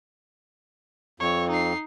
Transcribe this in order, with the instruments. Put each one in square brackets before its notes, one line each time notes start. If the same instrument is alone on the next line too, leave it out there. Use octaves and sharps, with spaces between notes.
[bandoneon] F2 [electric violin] C#5
[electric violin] D#4 C7